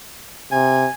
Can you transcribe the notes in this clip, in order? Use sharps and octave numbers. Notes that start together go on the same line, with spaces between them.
C3 G#5